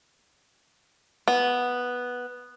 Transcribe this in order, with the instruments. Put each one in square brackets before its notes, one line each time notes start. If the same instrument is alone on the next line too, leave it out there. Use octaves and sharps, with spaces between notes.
[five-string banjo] B3